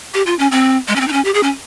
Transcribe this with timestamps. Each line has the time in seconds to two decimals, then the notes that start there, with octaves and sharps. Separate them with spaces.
0.14 G4
0.26 F4
0.39 C#4
0.51 C4
0.88 G#3
0.96 C#4
1.01 C4
1.08 D#4
1.13 C#4
1.25 G4
1.34 G#4
1.43 C#4